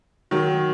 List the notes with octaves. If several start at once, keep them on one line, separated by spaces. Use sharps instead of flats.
D#3 F#3